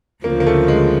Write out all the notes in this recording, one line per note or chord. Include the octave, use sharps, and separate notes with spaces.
D2 C#3 F3 A#3
A#3
A3
G#3